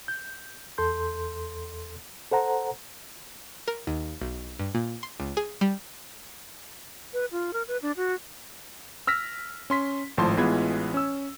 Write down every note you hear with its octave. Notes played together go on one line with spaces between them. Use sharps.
G6
E2 A4 C6 G6
A4 C5 F#5 A#5
A#4
D#2
B1
G2
A#2
C6
C#2
G#4
G3
B4
F4
A#4
B4
D4
F#4
E6 F6 A#6 B6
C#4 C6 B6
G#1 A2 F3 A5 C6
A1 E3 G#3 B3 F4 G#6
C#4 E6